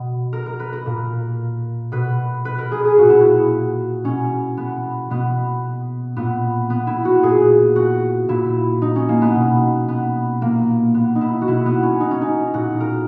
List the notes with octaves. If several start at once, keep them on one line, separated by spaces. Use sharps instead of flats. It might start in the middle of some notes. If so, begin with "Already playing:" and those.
Already playing: B2
A#4
A#4
B4
A#4
A#2
B2 B4
B4
A#4
G#4
G#4
A#2 F#4
E4
F#4
B2 C#4
B3
B2 B3
A#2 B3
B3
E4
F#4
A#2 G#4
F#4
A#2 E4
D#4
C#4
A#3
B3
B2
B3
A#2 A#3
B3
D#4
E4
F#4
B2 E4
B3
C#4
D#4
C#4
D#4
A#2 F#4
A#4